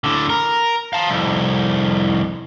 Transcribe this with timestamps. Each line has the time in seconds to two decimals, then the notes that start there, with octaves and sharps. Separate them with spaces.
0.04 A2 D3
0.30 A#4
0.93 F5 A5
1.10 C2 F2